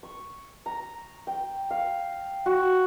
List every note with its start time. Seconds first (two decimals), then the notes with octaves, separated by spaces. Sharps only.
0.03 C#6
0.66 A#5
1.27 G5
1.71 F5
2.46 F#4